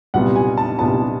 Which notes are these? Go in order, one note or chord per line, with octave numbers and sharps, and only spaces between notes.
C2 A#2 G3 B3 F#5
G#5
A5
C2 A#2 G3 B3 A5